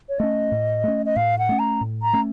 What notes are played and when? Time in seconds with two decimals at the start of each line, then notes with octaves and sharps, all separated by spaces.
0.09 C#5
0.19 A3 C#4 D#5
0.52 A2
0.84 A3 C#4
1.06 D#5
1.16 A2 F5
1.38 F#5
1.49 A3 C#4
1.59 A#5
1.81 A2
2.02 A#5
2.13 A3 C#4